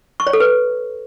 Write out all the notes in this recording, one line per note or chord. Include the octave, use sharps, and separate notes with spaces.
C#6
C#5
A4
B4